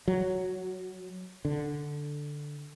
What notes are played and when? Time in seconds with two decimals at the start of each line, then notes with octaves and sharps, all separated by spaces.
0.08 F#3
1.45 D3